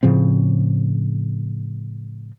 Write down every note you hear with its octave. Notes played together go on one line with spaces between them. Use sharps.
A2 C#3 F3 C4